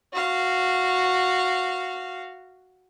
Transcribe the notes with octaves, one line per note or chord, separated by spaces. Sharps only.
F#4 F5